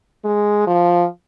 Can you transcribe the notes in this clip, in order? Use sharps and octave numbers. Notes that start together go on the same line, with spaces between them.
G#3
F3